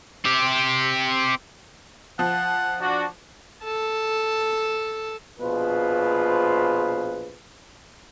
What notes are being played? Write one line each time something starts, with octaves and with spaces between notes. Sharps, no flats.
C4 G4
F3 F#5
D4 F#4
A4 A5
A#1 B2 F4 G#4 B4 C5